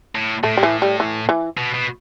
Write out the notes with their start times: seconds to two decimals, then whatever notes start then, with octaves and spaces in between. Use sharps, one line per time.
0.15 A2
0.44 A2 A3
0.57 G3
0.63 E3
0.82 G3
1.00 E3
1.29 E3
1.57 B2
1.74 B2